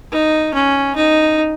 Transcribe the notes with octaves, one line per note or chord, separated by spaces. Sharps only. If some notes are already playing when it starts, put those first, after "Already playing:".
D#4
C#4
D#4